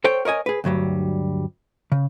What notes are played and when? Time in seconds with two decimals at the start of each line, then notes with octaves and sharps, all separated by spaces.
0.04 A4 C5 C#5 G5
0.25 A#4 C#5 D#5 G#5
0.46 G#4 B4
0.64 D2 G2 F#3 G3
1.92 C#3